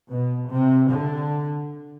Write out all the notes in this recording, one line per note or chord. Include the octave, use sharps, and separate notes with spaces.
B2
C3
D3